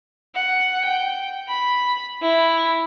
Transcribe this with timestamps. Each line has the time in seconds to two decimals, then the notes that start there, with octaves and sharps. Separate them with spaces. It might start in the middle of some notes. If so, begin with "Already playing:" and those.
0.35 F#5
0.85 G5
1.48 B5
2.22 E4